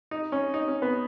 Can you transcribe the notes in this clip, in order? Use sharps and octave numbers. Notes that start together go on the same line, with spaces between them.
D#4
C#4
D#4
C#4
B3